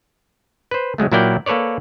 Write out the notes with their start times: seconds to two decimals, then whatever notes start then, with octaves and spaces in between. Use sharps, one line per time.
0.71 B4 C5
0.98 C#3 F#3 G#3 A3
1.12 A#2 F#3 E4 A#4 D5 G5
1.46 A#3 A4 B4 C#5 D5